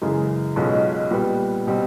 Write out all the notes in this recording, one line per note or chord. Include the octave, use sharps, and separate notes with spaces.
F#2 C#3 E3 G#3
B1 B2 G#3 C#4 F4
A#2 G3 B3
B2 G3 C4